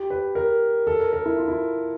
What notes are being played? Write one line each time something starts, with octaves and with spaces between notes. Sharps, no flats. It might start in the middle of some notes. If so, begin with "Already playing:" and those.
Already playing: G4
B4
A#4
A4
A#4
A#4
E4
F4
E4